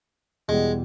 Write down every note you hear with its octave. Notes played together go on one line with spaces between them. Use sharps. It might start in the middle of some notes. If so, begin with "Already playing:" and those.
E2 B2 G3 G#3